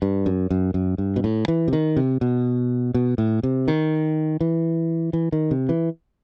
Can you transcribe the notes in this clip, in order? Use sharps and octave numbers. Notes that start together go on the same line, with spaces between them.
G2
F#2
F#2
F#2
G2
B2
A2
E3
C3
D#3
C3
B2
B2
A2
C3
D#3
E3
E3
D#3
C3
E3